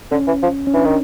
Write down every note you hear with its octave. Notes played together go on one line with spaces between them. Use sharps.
D3 C#4
E3
F3
C#4
E3 D4
D#3